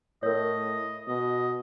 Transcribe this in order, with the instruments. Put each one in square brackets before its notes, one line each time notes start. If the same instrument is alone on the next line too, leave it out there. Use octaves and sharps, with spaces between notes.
[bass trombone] A2 [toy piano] A#4 C#5 [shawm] D#5
[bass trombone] B2 [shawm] D#5